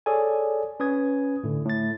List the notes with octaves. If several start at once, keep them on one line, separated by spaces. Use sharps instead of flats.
G#4 A4 C#5 D5 G#5
C#4 B4 D#6 G#6
A2 D3
A2 A6